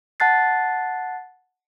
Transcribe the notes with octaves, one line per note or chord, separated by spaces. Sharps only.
F#5 A5 F#6 A6 C7